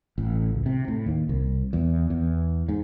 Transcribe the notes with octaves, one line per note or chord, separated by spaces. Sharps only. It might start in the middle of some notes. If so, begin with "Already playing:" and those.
A1
C#2
C3
A2
D#2
C2
E2
E2
G#2